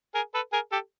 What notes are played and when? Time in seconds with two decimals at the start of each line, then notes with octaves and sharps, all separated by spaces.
0.15 G#4 A#4
0.34 A4 B4
0.53 G#4 A#4
0.72 G4 A4